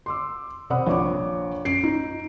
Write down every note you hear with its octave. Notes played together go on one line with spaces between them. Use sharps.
C6 D6 E6
C3 D5 F#5 B5 D#6
A#1 C#5 D6
F#2 C7 D7
D#4